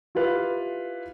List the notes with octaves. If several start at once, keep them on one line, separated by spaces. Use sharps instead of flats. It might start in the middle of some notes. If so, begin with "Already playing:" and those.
E4 F4 G4 B4 F5